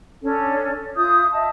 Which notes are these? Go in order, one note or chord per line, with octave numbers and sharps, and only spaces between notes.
C#4 D4 A4
F4 E5 D#6 G6
D#5 E5 A5